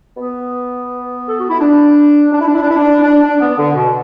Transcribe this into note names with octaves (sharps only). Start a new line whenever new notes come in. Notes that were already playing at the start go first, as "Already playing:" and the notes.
B3
A4
F#4
E4
D4
D4
E4
D4
E4
D4
E4
D4
D4
D4
B3
D3
B2